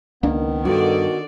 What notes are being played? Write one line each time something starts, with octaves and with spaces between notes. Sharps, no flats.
C#2 D#3 A#3 B3 D4
G2 D3 F#4 D5